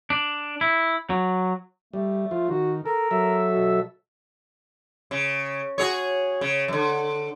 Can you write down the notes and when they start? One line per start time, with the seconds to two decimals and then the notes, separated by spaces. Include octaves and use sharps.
0.10 D4
0.61 E4
1.10 F#3
1.93 G3 A3
2.31 F3 F4
2.49 D#3 F#4
2.86 A4 A#4
3.11 F#3 A4 E5
3.52 B2
5.11 C#3
5.78 F#4 G#4 C#5
6.41 C#3
6.68 F#2 D3